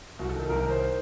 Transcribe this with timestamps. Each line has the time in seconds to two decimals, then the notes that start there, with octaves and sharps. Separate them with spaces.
0.19 C2 F#4
0.29 A4
0.35 D#3
0.40 A4
0.49 C2 A#4
0.60 A#4
0.64 D#3
0.70 C5